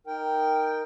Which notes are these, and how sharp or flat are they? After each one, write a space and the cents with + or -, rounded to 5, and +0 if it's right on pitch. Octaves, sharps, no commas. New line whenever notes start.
D#4 -5 A#4 +0 G5 +0